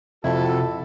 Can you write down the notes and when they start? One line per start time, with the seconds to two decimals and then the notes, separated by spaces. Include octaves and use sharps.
0.24 F2 C3 E4 F#4 A4